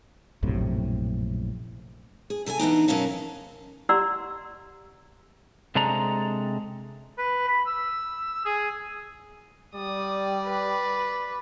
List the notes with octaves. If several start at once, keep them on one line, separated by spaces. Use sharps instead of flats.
A#1 F#2 A2 C3
G#4
C3 A4 D5 G#5
E3 B3 D4 D#4
F#2 B2 C#4 A#4 F5 A5
G4 D5 F#5 A#5 C6 E6
C3 G#3 D4 A4 A#5
B4
B5
E6
G#4
G3 D5 D#6
B4